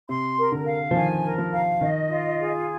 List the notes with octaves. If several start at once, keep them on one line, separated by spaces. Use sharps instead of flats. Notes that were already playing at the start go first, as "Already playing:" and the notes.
C3 C6
A#4
D3
F5
F3
D#3 G#5
A#4
F3
F5
D#3 D#5
F4
G#4